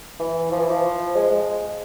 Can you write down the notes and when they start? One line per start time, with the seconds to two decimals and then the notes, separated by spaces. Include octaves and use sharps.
0.19 E3
0.52 F3
0.60 E3
0.70 F3
1.15 G#3
1.30 G#3